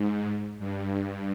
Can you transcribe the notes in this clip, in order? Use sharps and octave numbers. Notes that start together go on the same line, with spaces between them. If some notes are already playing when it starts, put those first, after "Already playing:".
Already playing: G#2
G2